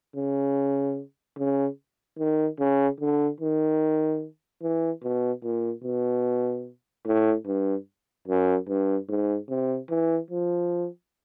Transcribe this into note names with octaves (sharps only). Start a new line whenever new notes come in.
C#3
C#3
D#3
C#3
D3
D#3
E3
B2
A#2
B2
A2
G2
F#2
G2
G#2
C3
E3
F3